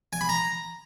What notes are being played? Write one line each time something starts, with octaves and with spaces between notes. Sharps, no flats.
G#5
B5
A#5